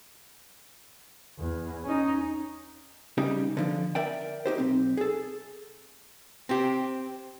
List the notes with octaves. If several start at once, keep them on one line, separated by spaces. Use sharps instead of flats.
E2
C#4 D#4
C#3 G3 D#4 G4
D3 E3 F3
A#4 D5 E5 G5
D#4 G4 C5
B1 C4
G#4 A4
C4 G4